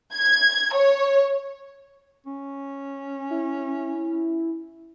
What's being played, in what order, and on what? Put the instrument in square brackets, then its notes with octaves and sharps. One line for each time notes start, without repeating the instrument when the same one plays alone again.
[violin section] G#6
C#5
[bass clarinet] C#4
[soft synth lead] E4